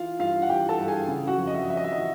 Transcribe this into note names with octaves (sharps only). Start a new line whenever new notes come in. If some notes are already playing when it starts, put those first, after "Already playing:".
Already playing: E3 F4 F5
G2 F4 F5
F#5
E3 G4 G5
A4 A5
G2
G#4 G#5
C#3
F#4 F#5
F2
D#5
E5
D#5
F2 E5
D#5
E5
D#5
E3